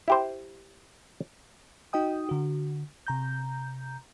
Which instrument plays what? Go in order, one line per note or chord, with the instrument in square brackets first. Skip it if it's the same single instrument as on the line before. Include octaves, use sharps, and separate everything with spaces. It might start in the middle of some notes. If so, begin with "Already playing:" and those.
[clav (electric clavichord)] E4 G4 C5
[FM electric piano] D#4 F#4 D#5 G5 D#6
D3 F#4
C3 A#5 G6